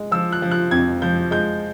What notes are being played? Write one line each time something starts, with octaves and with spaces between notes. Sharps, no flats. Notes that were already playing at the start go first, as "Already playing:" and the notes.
Already playing: G#3
F3 E6
F#6
F3
F#6
F2 G#6
F3 G6
G#3 G6